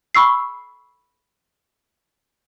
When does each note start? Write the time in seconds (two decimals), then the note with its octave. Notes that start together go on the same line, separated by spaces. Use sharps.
0.15 B5 C#6 E6 C7